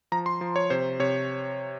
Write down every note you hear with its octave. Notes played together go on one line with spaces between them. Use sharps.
F3 A#5
C6
F3
C#5
C3 C5
C3 C#5